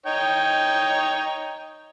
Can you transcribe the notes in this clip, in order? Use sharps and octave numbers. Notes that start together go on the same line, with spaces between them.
D#4 C#5 G5